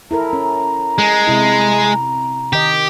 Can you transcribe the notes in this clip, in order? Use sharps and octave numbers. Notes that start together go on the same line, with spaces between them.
E4 A4 A#4 A#5
C#4
G#3
C3 E4
D#3 G4 D#5